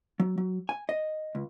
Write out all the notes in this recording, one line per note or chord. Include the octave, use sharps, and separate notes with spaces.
F#3
F#3
G#5
D#5
C#2